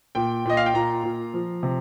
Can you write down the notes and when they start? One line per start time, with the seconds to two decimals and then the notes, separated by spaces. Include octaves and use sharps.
0.15 A#2 G5
0.45 A#2 D#5
0.57 F5
0.66 G5
0.74 A#2 A#5
1.03 A#2
1.34 F3
1.63 C3